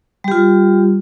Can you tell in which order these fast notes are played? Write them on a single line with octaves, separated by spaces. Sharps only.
G3 G4 F4